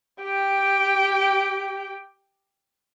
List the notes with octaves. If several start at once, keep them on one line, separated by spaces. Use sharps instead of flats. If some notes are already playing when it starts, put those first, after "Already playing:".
G4 G5